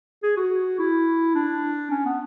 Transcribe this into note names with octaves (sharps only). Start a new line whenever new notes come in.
G#4
F#4
E4
D4
C#4
B3